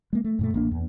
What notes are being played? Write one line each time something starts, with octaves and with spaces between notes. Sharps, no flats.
G#3 A#3
A3
F#2 A#2 A3
A1 A#3 D4
E2